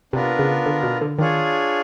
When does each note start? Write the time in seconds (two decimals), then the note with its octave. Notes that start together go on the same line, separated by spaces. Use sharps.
0.13 C3 B3 D4 F4 A#4
0.39 C#3
0.66 D3
0.83 B2
1.01 D3
1.18 D#3 D4 F4 G#4 C#5